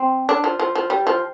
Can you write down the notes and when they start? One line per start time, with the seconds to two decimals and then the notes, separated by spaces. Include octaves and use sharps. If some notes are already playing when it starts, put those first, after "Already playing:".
Already playing: C4
0.29 D4
0.44 F3
0.59 F3
0.75 F3
0.90 G3
1.07 F3